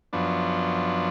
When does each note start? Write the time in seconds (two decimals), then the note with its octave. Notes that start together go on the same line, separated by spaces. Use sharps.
0.13 F#2 F3 B3 D4